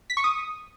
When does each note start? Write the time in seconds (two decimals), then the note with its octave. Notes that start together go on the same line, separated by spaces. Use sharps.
0.10 B6
0.17 C#6
0.24 D#6